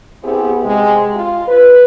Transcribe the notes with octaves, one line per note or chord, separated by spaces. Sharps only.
B3 C4 E4 G4 G#4
C3 G#3
F4
B4